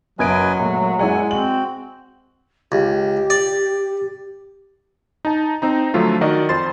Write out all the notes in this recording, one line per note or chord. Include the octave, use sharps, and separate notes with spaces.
F#1 F#3 B4 D#5 G#5 G#6 D7
A#2 G#3 A3
F#2 G#3 E4 D5 F#5 G#5
C4 F#4 F#7
C#2 G4
D5
D#4 A5
C4 D#4 A#5
D3 F3 F#3 A3 F4 A4
D#3 F#4 A#4 D5 D#5
F2 F4 C5 C6 A6